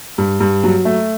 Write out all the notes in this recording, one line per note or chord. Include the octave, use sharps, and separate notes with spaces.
G2
G2
F#3
A3